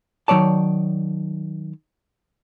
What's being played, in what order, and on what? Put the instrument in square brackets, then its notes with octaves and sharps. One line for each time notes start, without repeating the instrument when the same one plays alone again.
[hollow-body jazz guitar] D#3 F#3 C#5 D5 A5